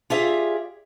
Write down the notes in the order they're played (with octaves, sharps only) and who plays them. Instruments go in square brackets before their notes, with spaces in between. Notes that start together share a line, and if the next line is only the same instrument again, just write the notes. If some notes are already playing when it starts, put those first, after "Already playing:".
[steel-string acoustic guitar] F4 G4 G#4 D5 E5 F5